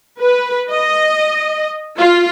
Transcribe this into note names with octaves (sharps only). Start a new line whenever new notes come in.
B4
D#5
F4